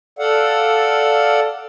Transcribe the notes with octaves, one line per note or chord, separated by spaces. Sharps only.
A4 D5 F5 F#5